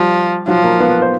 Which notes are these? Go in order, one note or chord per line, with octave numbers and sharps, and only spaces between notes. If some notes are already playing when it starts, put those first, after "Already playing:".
Already playing: F3 G3 G4
F3 F#3 F#4
A#3 A#4
B3 B4
C5